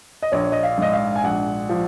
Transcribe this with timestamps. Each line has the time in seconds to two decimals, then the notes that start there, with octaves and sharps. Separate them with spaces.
0.22 D#5
0.32 A#1 C#5
0.52 D#5
0.63 F5
0.78 G#2 D#5
0.93 F5
1.16 G#5
1.24 A#1 F#5
1.69 F3